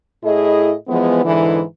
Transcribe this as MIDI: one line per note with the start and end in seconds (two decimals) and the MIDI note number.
0.24 0.74 45
0.24 0.74 64
0.24 0.74 68
0.24 0.74 75
0.89 1.23 52
0.89 1.23 53
0.89 1.23 56
0.89 1.23 59
1.24 1.61 44
1.24 1.61 50
1.24 1.61 52